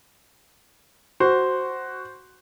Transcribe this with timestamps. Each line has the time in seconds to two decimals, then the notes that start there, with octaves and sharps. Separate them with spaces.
1.20 F#4 C5